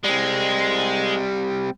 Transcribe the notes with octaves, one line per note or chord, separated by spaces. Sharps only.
G3 G#3 C4